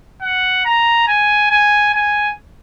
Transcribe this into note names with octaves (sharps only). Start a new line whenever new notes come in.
F#5
A#5
G#5
G#5
G#5